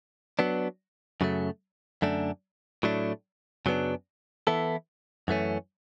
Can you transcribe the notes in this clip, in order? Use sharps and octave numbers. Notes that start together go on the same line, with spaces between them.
F#3 B3 D4
F#2 C#3 F#3 A3
F#2 D3 A3 D4
A2 F#3 A3 D4
F#2 C#3 F#3 B3 D4
E3 B3 E4 A4
F#2 E3 A3 C#4